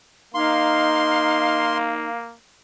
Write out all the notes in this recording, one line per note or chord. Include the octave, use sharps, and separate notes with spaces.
A#3 D#4 F5 C6